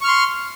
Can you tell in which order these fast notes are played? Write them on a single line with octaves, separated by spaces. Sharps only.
C#6 F6 C6